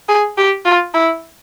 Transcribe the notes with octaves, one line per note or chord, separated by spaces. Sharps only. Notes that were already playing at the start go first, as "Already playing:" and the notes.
G#4
G4
F4
E4